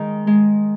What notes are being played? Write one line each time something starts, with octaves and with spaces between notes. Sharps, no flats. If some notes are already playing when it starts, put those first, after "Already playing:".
Already playing: D#3 G#3
G#3